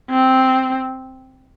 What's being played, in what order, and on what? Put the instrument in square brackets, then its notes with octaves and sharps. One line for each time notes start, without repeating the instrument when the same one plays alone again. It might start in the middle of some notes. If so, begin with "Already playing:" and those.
[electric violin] C4